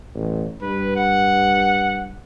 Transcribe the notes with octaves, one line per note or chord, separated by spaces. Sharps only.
A1
G2 B4
F#5